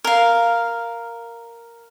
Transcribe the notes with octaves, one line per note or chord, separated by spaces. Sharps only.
A#4 F5